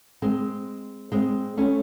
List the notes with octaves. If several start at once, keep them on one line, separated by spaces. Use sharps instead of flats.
G#3 C4
G#3 C4
A3 C#4